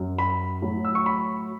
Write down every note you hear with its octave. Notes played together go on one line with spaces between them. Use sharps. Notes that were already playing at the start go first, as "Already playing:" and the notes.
Already playing: F#2 F#3
B5
A2 F#3
E6
C#6
B5